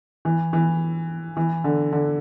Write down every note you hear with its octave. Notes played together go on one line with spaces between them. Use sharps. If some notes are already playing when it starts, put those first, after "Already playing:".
E3
E3
E3
D3
D3